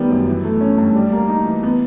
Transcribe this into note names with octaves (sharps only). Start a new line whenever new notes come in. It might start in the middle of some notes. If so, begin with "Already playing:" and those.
Already playing: D#3 G3 B3
F#2
E3
A3
C#4
G2
G3
A#3
D#4
E3
B3